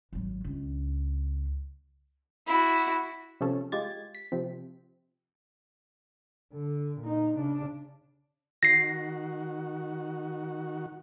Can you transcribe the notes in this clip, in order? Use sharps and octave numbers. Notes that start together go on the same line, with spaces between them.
G#1 F#3
C#2 D4
E4 F#4
C3 F3 C#4 A4
G#3 F4 G4 G#6 A6
B6
C3 F3 C4
D3
A#2 D#4
C#3 D4
D#3 F#4 A#6 C7